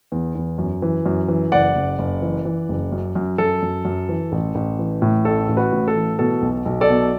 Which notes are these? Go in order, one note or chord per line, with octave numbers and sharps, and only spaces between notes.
E2
E2
F#2
E3
F#2
E3
F#1 D5 F#5
F#1
F#1
E3
E3
F#1
F#2
F#2
F#2 A4
F#2
F#2
E3
A1
A1
E3
A2
A1 A4
A1
F#4 B4
A2
A4
E3
B2 A4
B1
B1
A4 D5
B2